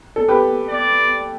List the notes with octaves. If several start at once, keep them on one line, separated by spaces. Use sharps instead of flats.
A4
G4 B4
D5